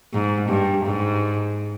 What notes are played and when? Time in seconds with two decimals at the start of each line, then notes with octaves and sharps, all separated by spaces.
0.13 G#2
0.49 G2
0.85 G#2